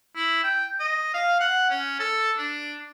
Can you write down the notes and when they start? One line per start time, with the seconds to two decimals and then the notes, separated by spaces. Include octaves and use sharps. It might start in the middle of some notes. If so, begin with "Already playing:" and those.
0.16 E4
0.43 G5
0.80 D#5
1.14 F5
1.40 F#5
1.70 C#4
1.99 A4
2.37 D4